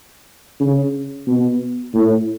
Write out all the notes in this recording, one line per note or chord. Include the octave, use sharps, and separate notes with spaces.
C#3
B2
A2